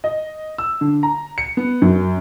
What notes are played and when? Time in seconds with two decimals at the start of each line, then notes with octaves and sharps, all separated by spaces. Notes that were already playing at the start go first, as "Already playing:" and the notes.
0.04 D#5
0.58 E6
0.81 D3
1.03 A#5
1.38 C#7
1.57 B3
1.82 F#2